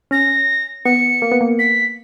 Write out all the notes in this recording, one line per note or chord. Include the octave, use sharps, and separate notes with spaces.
C#4 A#6
B3 C#7
A#3
B3
A#3
B6